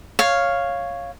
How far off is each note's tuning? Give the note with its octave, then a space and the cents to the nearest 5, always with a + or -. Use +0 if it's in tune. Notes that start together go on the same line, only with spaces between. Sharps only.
C#5 +0 F5 +0